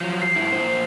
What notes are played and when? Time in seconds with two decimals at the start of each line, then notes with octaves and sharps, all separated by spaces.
0.01 F3 F#3
0.22 C7
0.36 G#2 E4
0.52 A#2 C5